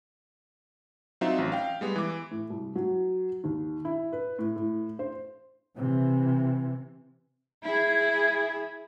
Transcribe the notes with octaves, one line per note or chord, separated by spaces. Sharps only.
F#3 C4 D#4 F4 E5
A1
F5 G5
G3 G#3 B3
E3 D6
A2
C2
F#3
D#2
E4
B4
A2
A2
C5
C3 E3
E4 G#4